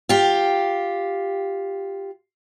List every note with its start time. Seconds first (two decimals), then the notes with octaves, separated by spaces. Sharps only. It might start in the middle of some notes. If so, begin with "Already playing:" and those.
0.09 F4 G4